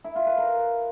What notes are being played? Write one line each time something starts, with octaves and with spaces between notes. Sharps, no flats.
E4
F4
B4
A#4